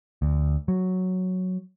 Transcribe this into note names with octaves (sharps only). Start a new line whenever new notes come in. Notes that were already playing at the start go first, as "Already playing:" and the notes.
D2
F#3